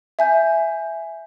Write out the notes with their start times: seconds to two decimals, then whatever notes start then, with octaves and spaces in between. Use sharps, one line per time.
0.19 E5 G#5 G6